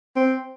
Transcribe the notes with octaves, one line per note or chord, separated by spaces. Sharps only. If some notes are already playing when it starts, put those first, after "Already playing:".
C4